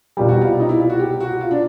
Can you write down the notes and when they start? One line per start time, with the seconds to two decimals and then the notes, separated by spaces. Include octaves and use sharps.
0.17 C2 B2 G3 F4
0.29 F#4
0.41 F4
0.59 D#4
0.69 E4
0.79 F4
0.90 F#4
0.99 G4
1.20 F#4
1.41 F4
1.51 D4